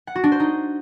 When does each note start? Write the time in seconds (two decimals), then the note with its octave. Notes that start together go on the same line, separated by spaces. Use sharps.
0.07 F#5
0.15 F#4
0.24 D4
0.32 C5
0.40 D#4